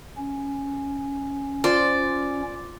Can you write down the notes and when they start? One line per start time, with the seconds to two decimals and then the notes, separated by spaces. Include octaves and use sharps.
0.17 C#4
1.64 F4 C5 D5